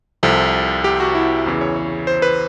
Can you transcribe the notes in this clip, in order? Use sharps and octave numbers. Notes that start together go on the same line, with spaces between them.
C2 C3 F3 A4
G4
F#4
E4
E2 C#3 E3
C#5
C#5
C5
B4